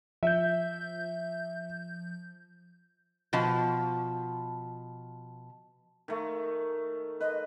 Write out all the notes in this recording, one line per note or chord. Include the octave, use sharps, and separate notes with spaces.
F3 E5 G6
B2 F3 A5
D#3 A3
B4 D#5